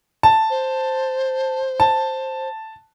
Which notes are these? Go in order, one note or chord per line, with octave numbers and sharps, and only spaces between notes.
A5
C5
A5